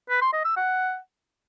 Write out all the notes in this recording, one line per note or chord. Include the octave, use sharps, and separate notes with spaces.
B4
C6
D#5
E6
F#5